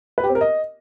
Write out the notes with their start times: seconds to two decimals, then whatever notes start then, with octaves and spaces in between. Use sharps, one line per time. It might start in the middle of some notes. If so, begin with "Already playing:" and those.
0.18 B4
0.24 G4
0.29 C4
0.35 A#4
0.41 D#5